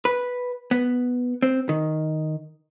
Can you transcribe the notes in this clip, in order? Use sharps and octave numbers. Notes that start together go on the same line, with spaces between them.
B4
B3
C4
D#3